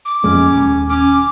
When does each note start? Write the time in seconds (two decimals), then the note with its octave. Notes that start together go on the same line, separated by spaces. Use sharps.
0.05 D6
0.24 F2 A#2 G#3 C#4
0.56 D#1
0.90 C#4 D6